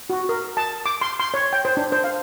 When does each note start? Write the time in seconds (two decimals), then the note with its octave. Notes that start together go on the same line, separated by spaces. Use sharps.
0.10 F#4
0.29 A#4
0.57 A5
0.86 D6
1.01 C6
1.19 C6
1.34 C#5
1.53 G5
1.65 C5
1.77 D4
1.92 C5
2.04 F5